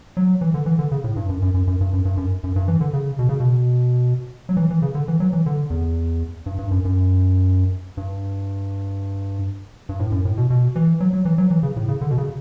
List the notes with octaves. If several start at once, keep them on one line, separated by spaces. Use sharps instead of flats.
F#3
E3
D3
E3
D3
C#3
A2
G2
F#2
F#2
F#2
F#2
G2
F#2
G2
F#2
F#2
G2
E3
D3
C#3
B2
C#3
B2
F#3
E3
E3
C#3
D3
E3
F#3
E3
D3
E2
G2
G2
F#2
F#2
G2
G2
A2
F#2
A2
B2
B2
E3
F#3
F#3
E3
F#3
E3
C#3
A2
C#3
D3
B2
C#3